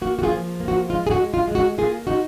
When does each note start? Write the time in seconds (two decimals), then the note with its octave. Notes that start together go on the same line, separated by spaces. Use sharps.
0.02 A#3 F#4
0.19 F#4
0.23 F4 G#4
0.31 F3
0.60 A#3
0.68 F#4
0.89 G#3 F4
1.07 G#4
1.11 F#4
1.18 G#3
1.34 F4
1.48 G#3
1.55 F#4
1.78 A#3 F4 G#4
2.07 D#4 F#4